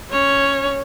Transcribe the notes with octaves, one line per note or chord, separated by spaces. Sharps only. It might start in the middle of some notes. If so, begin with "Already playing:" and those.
C#4 C#5